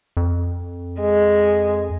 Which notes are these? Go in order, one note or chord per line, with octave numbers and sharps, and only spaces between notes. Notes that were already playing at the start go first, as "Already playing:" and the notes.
F2
G#3